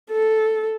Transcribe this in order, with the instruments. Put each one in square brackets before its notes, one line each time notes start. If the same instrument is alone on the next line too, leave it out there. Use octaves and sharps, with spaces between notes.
[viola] A4